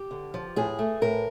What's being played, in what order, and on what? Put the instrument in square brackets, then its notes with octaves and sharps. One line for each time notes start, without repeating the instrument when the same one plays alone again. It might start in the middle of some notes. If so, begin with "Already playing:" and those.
Already playing: [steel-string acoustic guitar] G4
D3
F3
A2 G#4
A3
A2 A#4